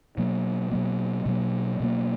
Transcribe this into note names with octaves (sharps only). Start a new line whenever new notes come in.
B2 F#3 A#3
B2 F#3 A#3
B2 F#3 A#3
B2 F#3 A#3